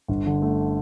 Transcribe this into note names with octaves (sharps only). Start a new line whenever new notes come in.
G1
D3
A3